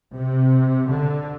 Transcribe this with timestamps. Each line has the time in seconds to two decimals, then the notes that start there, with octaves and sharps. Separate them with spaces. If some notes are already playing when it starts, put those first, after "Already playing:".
0.14 C3
0.91 D3